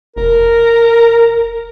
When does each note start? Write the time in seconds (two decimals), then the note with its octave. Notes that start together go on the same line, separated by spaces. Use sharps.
0.16 F1 A#4